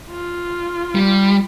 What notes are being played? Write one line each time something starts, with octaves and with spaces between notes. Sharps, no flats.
F4
G3